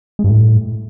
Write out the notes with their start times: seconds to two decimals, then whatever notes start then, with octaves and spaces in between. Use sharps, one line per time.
0.19 G#3
0.24 G2
0.29 A2